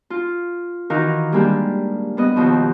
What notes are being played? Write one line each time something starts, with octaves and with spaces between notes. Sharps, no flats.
F4
D#3 E3 D#4 F#4 A#4 F5
G3 G#3 A#3 D4 G4
G3 B3 D#5
D#2 B2 F3